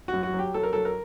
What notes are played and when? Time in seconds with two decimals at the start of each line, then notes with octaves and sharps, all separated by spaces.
0.08 F#4
0.13 F#2
0.23 F#4
0.34 F#3
0.39 G4
0.54 F#3 A4
0.63 A#4
0.73 F#3 A4
0.85 A#4